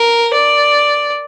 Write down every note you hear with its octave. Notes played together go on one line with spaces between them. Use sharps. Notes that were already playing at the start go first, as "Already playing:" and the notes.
Already playing: A#4
D5